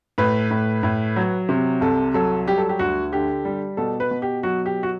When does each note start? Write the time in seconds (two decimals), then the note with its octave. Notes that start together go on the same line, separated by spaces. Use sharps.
0.18 A2 B4
0.51 A2
0.83 A2
1.16 F#3
1.49 C3
1.81 C2 A4
2.14 F#3 A4
2.47 G3 G4
2.58 A4
2.69 G4
2.79 D2 F#4
3.12 D3 G4
3.45 G3
3.77 B2 A4
4.00 B4
4.11 B2
4.22 G4
4.43 F#3 F#4
4.66 G4
4.83 F#4